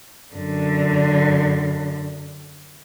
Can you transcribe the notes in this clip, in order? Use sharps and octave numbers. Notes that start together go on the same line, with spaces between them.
F#2 D3